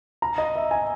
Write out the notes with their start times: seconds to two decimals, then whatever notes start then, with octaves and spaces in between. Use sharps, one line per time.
0.22 A#5
0.38 D#5
0.56 E5
0.71 G#5